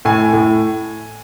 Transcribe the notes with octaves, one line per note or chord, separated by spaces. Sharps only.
A2 G#5
A2